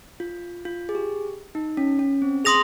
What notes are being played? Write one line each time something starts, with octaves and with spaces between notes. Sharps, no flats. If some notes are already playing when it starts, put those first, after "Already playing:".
F4
F4
G#4
G4
D#4
C#4
C#4
C4
G#4 C6 D#6 A#6 F7